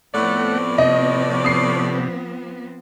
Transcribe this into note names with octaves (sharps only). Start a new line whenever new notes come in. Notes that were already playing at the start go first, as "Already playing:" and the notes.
A2 F3 A3 B3 C4 D5 F#5
C3 D#5
D#6 C7